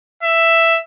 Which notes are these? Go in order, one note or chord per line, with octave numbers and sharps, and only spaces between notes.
E5